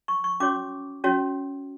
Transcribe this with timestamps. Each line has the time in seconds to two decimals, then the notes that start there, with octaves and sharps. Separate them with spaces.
0.08 C#6
0.24 C#6
0.40 C#4 F#4 C#5 D6
1.04 C#4 F#4 C#5